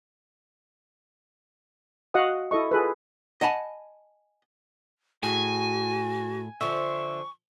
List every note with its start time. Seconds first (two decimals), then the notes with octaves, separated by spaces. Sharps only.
2.14 F#4 D#5 F5 F#5 D#6
2.51 E4 A4 D#5 C#6
2.71 F4 G#4 A4 B4
3.41 D#5 F#5 G#5 A5 B5
5.23 A2 F#4 G#4 G#5
6.61 D3 F3 E5 C#6